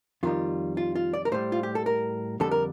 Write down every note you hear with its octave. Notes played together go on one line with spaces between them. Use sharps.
F2 D#3 G3 F4
F4
F4
D5
A#4
A2 G3 C5
F4
G4
A4
A#4
F2 D3 G3 A4
A#4